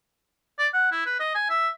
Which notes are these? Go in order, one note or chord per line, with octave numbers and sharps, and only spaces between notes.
D5
F#5
E4
B4
D#5
G#5
E5